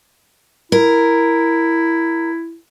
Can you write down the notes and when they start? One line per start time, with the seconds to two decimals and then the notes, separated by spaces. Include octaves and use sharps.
0.72 E4 A#4